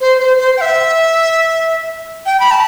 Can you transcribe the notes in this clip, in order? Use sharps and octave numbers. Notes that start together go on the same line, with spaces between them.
C5
C5
C5
G5
E5
G5
B5
A5